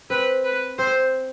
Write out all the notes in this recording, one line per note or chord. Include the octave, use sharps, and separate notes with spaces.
C4 B4
B4
C4 C5